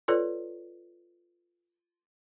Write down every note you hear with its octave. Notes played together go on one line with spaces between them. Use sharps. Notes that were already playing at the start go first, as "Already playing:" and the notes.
F4 A4 B4 C#5 D5